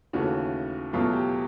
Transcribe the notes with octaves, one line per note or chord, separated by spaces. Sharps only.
D#2 C#3 E3 A3 F#4
E2 B2 F#3 A3 F4
G4